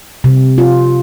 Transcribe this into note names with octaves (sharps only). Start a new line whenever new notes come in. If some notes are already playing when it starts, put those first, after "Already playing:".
C3
F4